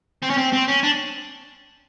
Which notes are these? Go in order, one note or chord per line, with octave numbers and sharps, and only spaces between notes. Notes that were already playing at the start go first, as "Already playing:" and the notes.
C4
C#4
C4
C4
C#4
D4